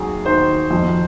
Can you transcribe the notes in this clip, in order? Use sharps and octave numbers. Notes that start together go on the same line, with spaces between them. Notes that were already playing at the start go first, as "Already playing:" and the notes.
Already playing: D#2 F#3 G#4
D#3 C5
F2